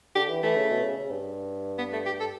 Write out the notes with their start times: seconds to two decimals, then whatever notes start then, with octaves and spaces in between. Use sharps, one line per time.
0.15 D3 G4
0.29 E3
0.43 E3 A3
0.56 C#3
0.70 B2
0.84 C#3
0.98 C#3
1.11 G2
1.78 B3
1.93 A3
2.06 G4
2.20 A4